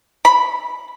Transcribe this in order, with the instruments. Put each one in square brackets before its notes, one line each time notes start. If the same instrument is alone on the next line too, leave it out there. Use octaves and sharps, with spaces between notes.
[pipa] B5